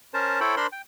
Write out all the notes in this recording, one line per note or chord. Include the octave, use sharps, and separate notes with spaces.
C#4 A#4 C5 A5
E4 A4 C5 C#5 G5 B5
D4 A#4 C5 B5 C6
G5